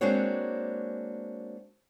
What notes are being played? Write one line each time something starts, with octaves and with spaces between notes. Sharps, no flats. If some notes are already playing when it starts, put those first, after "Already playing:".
G#3 A#3 C4 D4 F#4 C#5